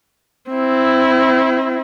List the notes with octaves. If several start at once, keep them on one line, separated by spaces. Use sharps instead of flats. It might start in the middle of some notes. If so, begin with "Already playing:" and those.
C4 E4